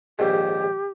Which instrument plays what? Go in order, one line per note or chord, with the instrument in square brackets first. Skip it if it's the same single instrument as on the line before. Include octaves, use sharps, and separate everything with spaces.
[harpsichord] A#1 D#2 G#2 [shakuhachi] G4